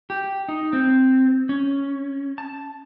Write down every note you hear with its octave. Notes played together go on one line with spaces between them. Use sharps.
G4
D#4
C4
C#4
A5